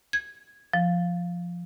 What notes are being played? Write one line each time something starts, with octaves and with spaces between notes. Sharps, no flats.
G#6
F3